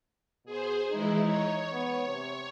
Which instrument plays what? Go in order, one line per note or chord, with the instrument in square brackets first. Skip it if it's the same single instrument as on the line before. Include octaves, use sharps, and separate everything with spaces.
[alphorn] B2 [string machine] G#4 C5
[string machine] E3 G#3 E4 [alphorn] D#4
[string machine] C#5
[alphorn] B3
C3